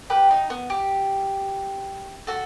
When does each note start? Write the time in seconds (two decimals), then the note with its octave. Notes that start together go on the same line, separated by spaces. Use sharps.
0.10 G4 B4
0.31 D#4
0.50 B3
0.70 G4
2.27 F#4 A4